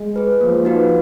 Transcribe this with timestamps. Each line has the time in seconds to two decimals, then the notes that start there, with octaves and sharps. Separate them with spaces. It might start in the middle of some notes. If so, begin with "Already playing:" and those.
Already playing: G#3
0.16 G#4 B4
0.41 F3 A#3
0.65 D#4 F#4 B4 F5